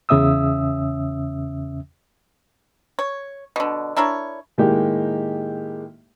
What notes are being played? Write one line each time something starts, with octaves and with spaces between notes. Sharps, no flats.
E2 C#3 C#4 E5 D#6 E6
C#5
B2 D3
D4 E4 A#4 C#5
A2 D#3 G#3 A#3 D#4 G4